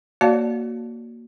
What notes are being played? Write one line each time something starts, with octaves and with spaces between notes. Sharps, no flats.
A#3 F#4 C#5 D5 F5 A5